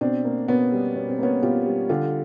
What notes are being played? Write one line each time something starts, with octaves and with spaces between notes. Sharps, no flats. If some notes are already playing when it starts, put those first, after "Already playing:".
B2 C4 D4
A#3
B2 B3 C#4
G3
B2 C#4
C4
A#3 B3 C#4
B2 F4 G4
G3
D3 F4 G4